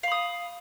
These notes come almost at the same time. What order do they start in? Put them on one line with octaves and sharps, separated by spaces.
F5 B5 D#6